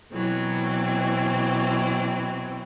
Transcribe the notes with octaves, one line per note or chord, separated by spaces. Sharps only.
B2 E3 F#3 C4